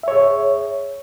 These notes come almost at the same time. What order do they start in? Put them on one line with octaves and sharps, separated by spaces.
E5 C#5 G#4